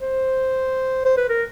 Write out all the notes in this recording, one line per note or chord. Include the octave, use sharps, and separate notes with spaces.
C5
C5
B4
A#4